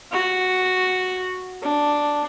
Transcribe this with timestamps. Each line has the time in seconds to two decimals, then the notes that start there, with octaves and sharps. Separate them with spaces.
0.12 F#4
1.62 D4